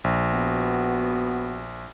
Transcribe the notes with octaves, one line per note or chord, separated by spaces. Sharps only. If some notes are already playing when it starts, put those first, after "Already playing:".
A#1
B3 F#4